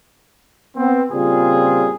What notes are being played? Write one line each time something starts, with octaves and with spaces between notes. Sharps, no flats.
B3 C4
A#2 C#3 G3 C4 F4 G#4